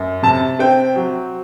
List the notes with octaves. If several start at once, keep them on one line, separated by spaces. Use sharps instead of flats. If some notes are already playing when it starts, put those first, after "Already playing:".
Already playing: F#2
C3 A5
C4 G5
F#3